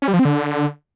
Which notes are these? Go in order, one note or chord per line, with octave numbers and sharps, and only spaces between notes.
C#4
G3
F3
C4
D3